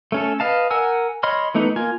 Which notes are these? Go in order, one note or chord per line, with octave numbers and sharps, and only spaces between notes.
A3 C#4 A4
B4 D#5 F5 A5
A#4 F#5 G#5 E6
C#5 D#5 B5 C6 F6
E3 A3 B3 D#4
A#3 F4 G#5